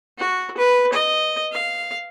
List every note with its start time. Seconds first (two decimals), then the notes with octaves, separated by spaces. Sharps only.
0.18 F#4
0.57 B4
0.93 D#5
1.52 F5